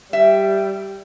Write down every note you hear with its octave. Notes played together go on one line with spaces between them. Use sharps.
G3 E5